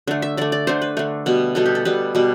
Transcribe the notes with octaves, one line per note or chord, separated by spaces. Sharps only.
D3 A3
E5
D3 A3 D5
D5
D3 A3 C5
B4
D3 A3
B2 G3 B3
B2 G3 B3 A4
G4
A4
B2 G3 B3 B4
B2 G3 B3